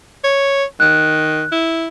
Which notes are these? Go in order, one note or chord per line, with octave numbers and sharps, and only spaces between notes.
C#5
D#3 F#6
E4